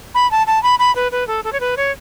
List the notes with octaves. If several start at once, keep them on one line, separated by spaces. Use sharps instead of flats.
B5
A5
A5
B5
B5
B4
B4
A4
A4
C#5
B4
C#5